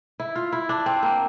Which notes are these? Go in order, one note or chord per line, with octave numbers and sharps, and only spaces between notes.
E4
F4
E4
D4
C4
A#3